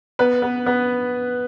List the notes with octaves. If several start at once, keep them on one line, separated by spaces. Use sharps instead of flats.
B3 B4
B3
B3